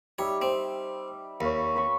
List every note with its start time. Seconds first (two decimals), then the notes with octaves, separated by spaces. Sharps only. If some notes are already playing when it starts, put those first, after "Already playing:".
0.19 G3 D#4 C#5 E5
0.42 C4
1.41 D#2 C#5 F5 B5
1.75 B4 B5 C#6